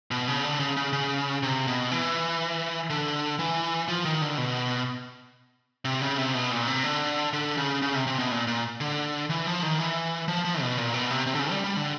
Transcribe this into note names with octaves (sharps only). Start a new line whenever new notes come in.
B2
C#3
D3
C#3
C#3
C#3
C3
B2
E3
D3
E3
F3
D#3
D3
B2
C3
C#3
C3
B2
A#2
C3
D3
D3
C#3
C#3
C3
C3
B2
A#2
A#2
D3
E3
F3
D#3
E3
F3
F3
B2
A#2
B2
C3
C3
D3
C#3
G3
G3
D3